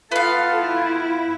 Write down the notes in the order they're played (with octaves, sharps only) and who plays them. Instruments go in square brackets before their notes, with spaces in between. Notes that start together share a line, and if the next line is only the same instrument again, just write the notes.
[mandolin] B3 F5 [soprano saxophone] F4 [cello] A4
[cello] E4